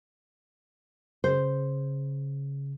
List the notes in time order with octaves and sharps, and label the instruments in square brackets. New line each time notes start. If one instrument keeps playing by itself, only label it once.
[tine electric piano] C#3 [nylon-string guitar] C5